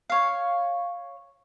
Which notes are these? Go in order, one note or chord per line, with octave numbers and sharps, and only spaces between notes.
C#5 F5